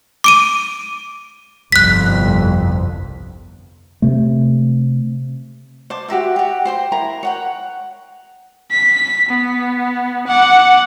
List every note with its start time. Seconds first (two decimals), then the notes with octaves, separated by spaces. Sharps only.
0.24 D6 D7 D#7
1.72 G1 C2 F2 F#6 B6
4.02 C3 A3
5.90 C5 A5 D6
6.08 F#4 G4 A#4 E5
6.36 F#4 G4
6.65 C5 G5 C6
6.92 E4 A#4 A#5
7.23 C#5 F#5 G5
8.71 B6
9.29 B3
10.27 F#5 D6